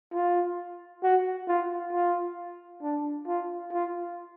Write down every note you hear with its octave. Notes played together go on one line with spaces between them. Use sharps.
F4
F#4
F4
F4
D4
F4
F4